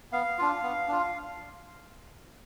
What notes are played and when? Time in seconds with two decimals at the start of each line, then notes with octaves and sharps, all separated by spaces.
0.12 B3 F5
0.38 D4 F4
0.63 B3
0.88 D4 F4